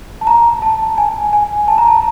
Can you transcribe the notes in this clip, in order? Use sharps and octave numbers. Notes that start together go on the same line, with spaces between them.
A5
A#5
A5
G#5
G#5
A5
A#5
A5